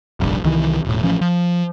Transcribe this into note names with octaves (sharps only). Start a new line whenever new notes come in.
F1 A#1 G2
C2 D#3 E3
E1 A2
A1 F3 C#4
F3